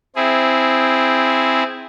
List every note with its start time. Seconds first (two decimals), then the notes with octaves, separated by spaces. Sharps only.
0.16 C4 E4 G#4